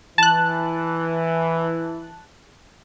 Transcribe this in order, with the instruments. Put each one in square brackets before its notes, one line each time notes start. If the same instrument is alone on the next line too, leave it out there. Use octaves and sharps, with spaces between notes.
[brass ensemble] E3 [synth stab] A5 F#6